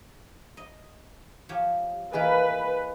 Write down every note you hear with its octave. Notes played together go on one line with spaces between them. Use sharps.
D#5
F3 G4 C#5
E3 A#3 G#4 A#4 B4 D#5 G#5